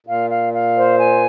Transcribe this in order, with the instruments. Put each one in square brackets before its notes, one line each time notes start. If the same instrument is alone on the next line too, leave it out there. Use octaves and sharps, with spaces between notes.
[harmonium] A#2 [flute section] F5
[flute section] F5
F5
C5
G#5